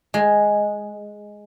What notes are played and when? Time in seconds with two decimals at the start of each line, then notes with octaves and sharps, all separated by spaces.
0.14 G#3